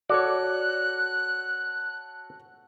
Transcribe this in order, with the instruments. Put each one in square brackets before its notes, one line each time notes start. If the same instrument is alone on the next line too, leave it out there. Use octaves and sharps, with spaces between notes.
[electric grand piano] F#4 A4 C#5 [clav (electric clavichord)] D5 [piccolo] F#6